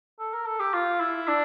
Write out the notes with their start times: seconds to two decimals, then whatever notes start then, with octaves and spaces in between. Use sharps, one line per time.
0.19 A4
0.33 A#4
0.46 A4
0.60 G4
0.74 F4
1.01 E4
1.28 D4